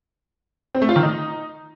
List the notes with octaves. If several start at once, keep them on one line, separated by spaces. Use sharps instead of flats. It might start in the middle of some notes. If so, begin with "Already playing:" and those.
C4
A3
F4
D#3
D#4